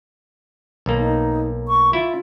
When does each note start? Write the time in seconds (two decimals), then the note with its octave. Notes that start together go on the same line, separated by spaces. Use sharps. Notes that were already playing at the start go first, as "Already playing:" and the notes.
0.86 B1 A#3
1.00 D#4
1.68 C#6
1.93 E4 F4